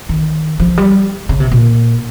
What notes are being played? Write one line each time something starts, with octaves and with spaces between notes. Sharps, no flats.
D#3
F3
G3
C#3
C3
A#2